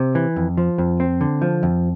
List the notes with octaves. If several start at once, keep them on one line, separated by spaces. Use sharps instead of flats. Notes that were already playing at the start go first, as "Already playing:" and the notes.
Already playing: C3
E3
F2
F3
F2
C4
D3
F3
F2